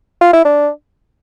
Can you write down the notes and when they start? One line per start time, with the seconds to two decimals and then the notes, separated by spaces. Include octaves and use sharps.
0.21 F4
0.33 E4
0.45 D4